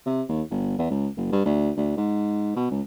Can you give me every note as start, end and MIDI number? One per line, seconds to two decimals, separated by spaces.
0.06 0.22 48
0.28 0.42 39
0.51 0.78 31
0.78 0.87 40
0.90 1.08 37
1.17 1.30 30
1.32 1.42 43
1.46 1.71 38
1.77 1.95 38
1.97 2.55 44
2.56 2.67 47
2.71 2.81 37